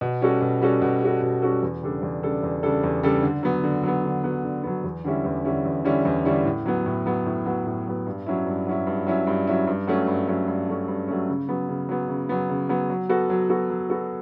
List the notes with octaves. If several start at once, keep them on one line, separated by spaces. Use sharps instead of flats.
B2
G3 C#4 F#4 A4
B2
G3 C#4 F#4 A4
B2
G3 C#4 F#4 A4
B2
G3 C#4 F#4 A4
E2
C#3 G3 D4 A4
E2
C#3 G3 D4 A4
E2
C#3 G3 D4 A4
E2
C#3 G3 D4 A4
D3
F#3 B3
D3
F#3 B3
D3
F#3 B3
D3
F#3 B3
E2
D3 G3 C#4 E4
E2
D3 G3 C#4 E4
E2
D3 G3 C#4 E4
E2
D3 G3 C#4 E4
A2
F#3 B3
A2
F#3 B3
A2
F#3 B3
A2
F#3 B3
G2
F#3 C#4 E4
G2
F#3 C#4 E4
G2
F#3 C#4 E4
G2
F#3 C#4 E4
G2
F#3 A3 C#4
G2
F#3 A3 C#4
G2
F#3 A3 C#4
G2
F#3 A3 C#4
C#3
F#3 B3
C#3
F#3 B3
C#3
F#3 B3
C#3
F#3 B3
F#3
B3 F#4 A4
F#3
B3 F#4 A4
F#3
B3 F#4 A4